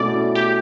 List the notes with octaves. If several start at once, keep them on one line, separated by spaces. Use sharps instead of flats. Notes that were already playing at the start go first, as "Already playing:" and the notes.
Already playing: B2 A3 C#4 E4 D5
G4